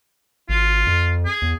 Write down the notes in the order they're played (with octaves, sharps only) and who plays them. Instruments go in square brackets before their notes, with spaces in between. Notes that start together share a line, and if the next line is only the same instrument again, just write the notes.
[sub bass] G#1 [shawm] F4
[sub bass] F2
[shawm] G#4
[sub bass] E2